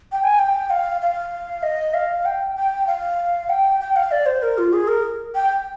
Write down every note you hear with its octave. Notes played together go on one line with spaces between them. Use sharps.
G5
G#5
G5
F5
F5
D#5
F5
G5
G5
F5
G5
G5
F5
D5
C5
A#4
F4
G#4
A#4
G5